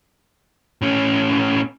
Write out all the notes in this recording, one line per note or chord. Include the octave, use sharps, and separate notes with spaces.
A2 C#4